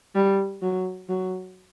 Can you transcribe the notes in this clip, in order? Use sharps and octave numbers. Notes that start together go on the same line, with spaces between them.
G3
F#3
F#3